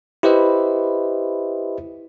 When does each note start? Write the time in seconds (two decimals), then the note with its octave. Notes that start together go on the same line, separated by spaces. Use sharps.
0.23 E4 G4 B4 C5 D#5 E5